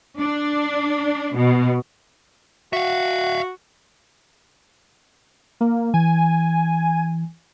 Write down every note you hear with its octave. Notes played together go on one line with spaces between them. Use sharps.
D4
B2
F#4 E5 F5
A#3
E3 G#5